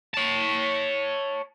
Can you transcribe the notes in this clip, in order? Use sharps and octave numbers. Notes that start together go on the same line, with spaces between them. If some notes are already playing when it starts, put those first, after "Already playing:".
C#5 A5